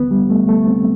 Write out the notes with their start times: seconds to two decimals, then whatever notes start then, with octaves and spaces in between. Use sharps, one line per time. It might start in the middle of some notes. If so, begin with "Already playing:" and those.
Already playing: D2 D3 B3
0.11 G3
0.30 A3
0.49 A3
0.67 C4